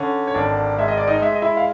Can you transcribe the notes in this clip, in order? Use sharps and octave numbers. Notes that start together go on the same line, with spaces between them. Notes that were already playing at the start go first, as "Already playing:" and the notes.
Already playing: D3 C#4
C#5
G#1 D4 D5
G#3 E5
D#5
D5
D#4 D#5
G#3 E5
D#5
E4 E5
F5